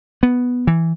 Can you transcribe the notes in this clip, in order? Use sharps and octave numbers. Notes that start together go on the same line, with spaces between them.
B3
E3